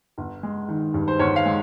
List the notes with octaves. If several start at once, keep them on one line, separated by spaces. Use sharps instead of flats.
G1
G#3
D#3
G2
C5
G1 C#5
F5
G#3